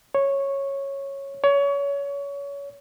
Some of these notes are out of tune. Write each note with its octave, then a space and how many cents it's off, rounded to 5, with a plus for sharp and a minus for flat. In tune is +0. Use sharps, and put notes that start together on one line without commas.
C#5 -10
C#5 +25